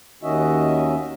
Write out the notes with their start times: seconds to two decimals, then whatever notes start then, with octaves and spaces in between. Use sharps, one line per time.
0.23 D#2 D#3 C#4 F#4 D#5 E5